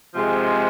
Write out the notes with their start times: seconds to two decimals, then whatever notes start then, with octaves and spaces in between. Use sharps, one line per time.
0.14 C3 F3 G#3